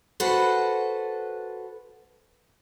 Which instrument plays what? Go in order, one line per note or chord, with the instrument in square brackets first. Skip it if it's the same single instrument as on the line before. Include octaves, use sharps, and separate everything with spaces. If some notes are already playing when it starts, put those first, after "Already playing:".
[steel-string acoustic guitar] F#4 A4 B4 C5